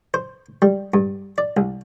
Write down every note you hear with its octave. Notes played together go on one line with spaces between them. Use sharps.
C5
G3
G2
D5
C2